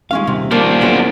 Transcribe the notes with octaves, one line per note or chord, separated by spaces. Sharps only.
D#1 G#3 C#4 F5
C3
F3 A#3 D4
F#1 B3 C#4 C5